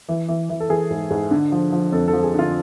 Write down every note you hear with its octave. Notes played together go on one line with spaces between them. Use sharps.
E3
E3
E3
A4
E3 G#4
G#2
G#2
D3
F3
F3
F2 A4
A4
F3
G#4
D3 F4